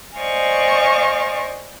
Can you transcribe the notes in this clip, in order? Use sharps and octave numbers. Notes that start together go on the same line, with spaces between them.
C5 D5 D#5 F5 G#5 C#6